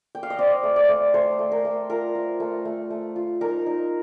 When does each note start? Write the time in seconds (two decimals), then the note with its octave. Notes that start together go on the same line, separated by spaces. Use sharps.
0.15 G5
0.23 F5
0.30 D#5
0.38 C4 D5
0.63 A3
0.76 D5
0.89 A3
1.14 A3 C5
1.39 A3
1.52 A#4
1.65 A3
1.89 F4 A#4
2.15 F4
2.40 A3
2.65 A3
2.90 A3
3.16 F4
3.41 D#4 A#4
3.66 D#4